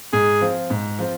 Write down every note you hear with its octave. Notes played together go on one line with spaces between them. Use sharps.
G#2 G#4
F3 C4 F4
G#2
F3 C4 F4